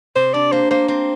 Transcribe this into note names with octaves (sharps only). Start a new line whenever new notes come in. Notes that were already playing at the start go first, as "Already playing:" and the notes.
C3 C5
D4 D5
A#3 C5
A#3 C5
C4 C5